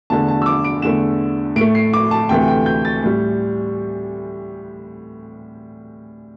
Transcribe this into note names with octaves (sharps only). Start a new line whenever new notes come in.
E2 D3 A3 A5
A5
E6
D6
D7
E2 D3 A3 E7
A2 A3 D7
C7
D6
A5
D2 C3 E3 A3 G5
G5
G6
A6
A2 G3